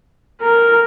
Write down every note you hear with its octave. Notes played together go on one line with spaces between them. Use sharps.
A#4